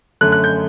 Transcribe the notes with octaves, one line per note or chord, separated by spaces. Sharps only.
F#2 D3 A3 F#6
F#6
G6